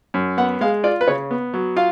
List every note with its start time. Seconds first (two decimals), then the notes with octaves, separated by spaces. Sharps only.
0.14 F#2
0.38 B3 F#5
0.61 G#3 F5
0.84 F4 D5
1.01 B4
1.08 C#3 C#5
1.31 B3
1.54 F#3
1.76 F4 F5